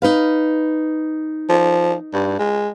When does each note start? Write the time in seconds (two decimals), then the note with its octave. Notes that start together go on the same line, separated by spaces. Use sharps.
0.02 D#4 B4 F5
1.49 F3
2.13 G2
2.39 G#3